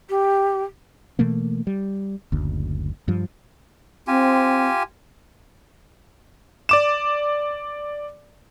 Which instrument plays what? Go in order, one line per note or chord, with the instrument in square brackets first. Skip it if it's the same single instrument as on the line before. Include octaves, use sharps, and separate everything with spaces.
[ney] G4
[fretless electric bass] B2 E3 A3 A#3
G3
F#1 D2
G2 F3
[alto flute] C4 [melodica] F4 G4 G#5
[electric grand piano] D5 D6 E7